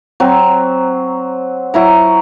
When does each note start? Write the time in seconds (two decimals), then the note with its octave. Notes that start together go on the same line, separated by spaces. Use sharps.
0.20 F#3 C4
1.74 F#3 E4 A#5